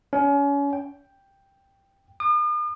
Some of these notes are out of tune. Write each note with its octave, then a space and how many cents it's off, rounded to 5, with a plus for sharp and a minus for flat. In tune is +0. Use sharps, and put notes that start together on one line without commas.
C#4 +30
G5 +5
D#6 -45